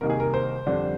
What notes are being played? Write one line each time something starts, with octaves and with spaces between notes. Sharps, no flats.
C2 C3 D#3 A#3 D#4 A#4
G#4
A#4
C5
F2 D3 G3 D4